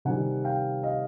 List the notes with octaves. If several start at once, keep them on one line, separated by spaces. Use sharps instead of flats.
C3 D#3 G3 F#5 G#5
F5 G5
D#5 F5